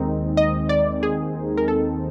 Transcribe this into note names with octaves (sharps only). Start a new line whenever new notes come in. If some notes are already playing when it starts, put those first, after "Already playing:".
Already playing: D#2 D#3 G#3 C4 D#4
D#5
D5
G#4
A#4
A4